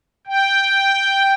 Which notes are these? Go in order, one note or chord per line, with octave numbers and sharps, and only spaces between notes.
G5